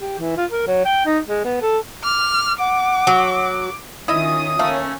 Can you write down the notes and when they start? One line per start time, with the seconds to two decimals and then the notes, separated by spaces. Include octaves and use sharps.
0.01 G4
0.19 E3
0.37 F4
0.51 A#4
0.67 F#3
0.85 G5
1.06 D#4
1.28 G#3
1.45 B3
1.62 A4
2.04 D6 F6
2.59 F#5 D6
3.07 F#3
4.08 D#3 C#4 E4 F4 D#5 E5 D#6
4.59 D#3 A3 A#3 C#4 F5